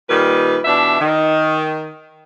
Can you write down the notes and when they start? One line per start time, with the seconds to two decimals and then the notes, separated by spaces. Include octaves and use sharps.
0.10 A#2 D#3 G3 B4
0.65 B2 E3 D4 E5
1.00 D#3